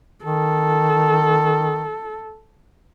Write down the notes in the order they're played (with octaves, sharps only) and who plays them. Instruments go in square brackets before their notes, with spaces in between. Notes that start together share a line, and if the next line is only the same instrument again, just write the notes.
[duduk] D#3 [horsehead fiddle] A4